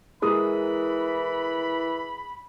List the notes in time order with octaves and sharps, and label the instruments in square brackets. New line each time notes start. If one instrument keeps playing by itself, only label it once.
[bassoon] E3 [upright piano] G#3 D#6 [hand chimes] E4 A#4 [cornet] B5